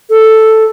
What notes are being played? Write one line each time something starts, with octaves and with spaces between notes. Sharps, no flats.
A4